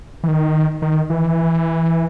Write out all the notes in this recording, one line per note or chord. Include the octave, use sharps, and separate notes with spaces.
E3
D#3
D#3
E3